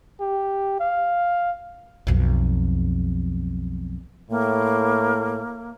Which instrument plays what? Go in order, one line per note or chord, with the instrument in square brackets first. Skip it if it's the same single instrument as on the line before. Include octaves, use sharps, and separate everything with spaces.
[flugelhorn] G4
F5
[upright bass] B1 F2
[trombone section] A2 [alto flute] A#3